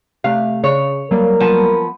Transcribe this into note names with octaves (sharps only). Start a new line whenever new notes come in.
C3 A3 F5
C#3 C#5
F#3 G3 A#3 A#4
F3 B3 A5